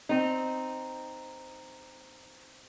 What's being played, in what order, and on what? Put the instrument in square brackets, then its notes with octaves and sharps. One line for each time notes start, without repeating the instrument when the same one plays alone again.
[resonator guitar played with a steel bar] C4 D#4